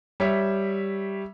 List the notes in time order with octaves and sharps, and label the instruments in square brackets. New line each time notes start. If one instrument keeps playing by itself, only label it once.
[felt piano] G3 C#5 E5